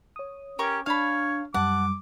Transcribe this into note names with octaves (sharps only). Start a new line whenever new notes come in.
C#5 D#6
C#4 G4 A#4 C#6
D4 C#5 F5 A5 B5 F6
F#2 G3 F#5 A5 D6